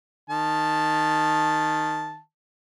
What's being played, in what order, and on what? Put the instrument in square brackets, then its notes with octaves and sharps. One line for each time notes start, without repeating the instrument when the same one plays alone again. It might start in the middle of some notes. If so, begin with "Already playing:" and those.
[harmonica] D#3 A5